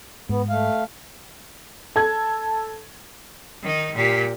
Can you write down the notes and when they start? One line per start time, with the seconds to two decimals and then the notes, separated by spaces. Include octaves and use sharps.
0.29 G#2 B3
0.50 A3 F5
1.96 A4 G#6
3.62 D#3 D#4
3.95 A#2 G4